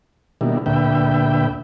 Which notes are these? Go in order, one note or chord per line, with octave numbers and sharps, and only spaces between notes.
B2 D#3 G3 A#3 D4 E4
D2 A#2 D3 B4 E5 G5